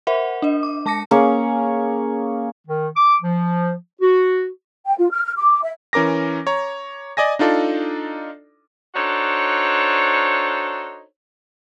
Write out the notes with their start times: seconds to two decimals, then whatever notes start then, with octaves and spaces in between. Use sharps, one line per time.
0.07 A#4 C5 E5 F#5
0.42 D4 D#5
0.63 D6
0.86 G#3 A5 D6 A#6 C#7
1.11 A#3 C#4 G#4 C#5
2.67 D#3
2.95 D6
3.22 F3
4.01 F#4
4.86 G5
4.98 F4
5.11 F6
5.24 F6
5.37 D6
5.63 E5
5.93 E3 C#4 A#4 D6 A#6
6.47 C#5 A#5
7.17 D5 D#5 G#5 A#6
7.39 D4 D#4 F4 A4 D5
8.95 D4 D#4 F#4 A4 C5 C#5